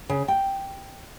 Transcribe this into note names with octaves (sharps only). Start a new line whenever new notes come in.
C#3
G5